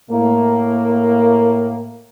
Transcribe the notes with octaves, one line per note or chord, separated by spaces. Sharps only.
A2 A#3